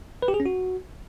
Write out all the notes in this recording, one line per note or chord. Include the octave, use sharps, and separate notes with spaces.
B4
G4
G#4
C#4
F#4